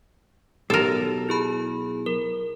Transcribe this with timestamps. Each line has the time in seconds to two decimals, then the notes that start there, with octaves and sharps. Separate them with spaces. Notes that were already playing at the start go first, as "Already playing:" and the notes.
0.70 B1 G4 A4 A#4
1.29 E4 G#4 B5
2.06 A#4